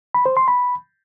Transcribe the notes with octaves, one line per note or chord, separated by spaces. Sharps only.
B5
C5
C6
B5